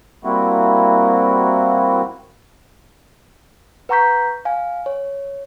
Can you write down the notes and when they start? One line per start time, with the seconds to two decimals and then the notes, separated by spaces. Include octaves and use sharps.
0.24 G3 A#3 C4 E4 F#4
3.89 B4 F#5 A#5 C#6 G6 B6
4.45 F5 G#5
4.86 C#5